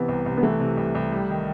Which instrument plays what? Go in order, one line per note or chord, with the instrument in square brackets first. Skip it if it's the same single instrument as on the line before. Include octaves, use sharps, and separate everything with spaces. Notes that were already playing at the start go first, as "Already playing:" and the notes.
Already playing: [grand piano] C3 E3 [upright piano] B3
[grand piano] C2
C2
[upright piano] B3
[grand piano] E3 [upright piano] A3
[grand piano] C3
C2
C2
G3
D#3